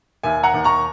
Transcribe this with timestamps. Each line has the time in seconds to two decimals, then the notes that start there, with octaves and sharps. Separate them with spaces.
0.23 D#2 E5 G#5
0.43 F#5 A#5
0.54 D#2
0.64 A#5 C#6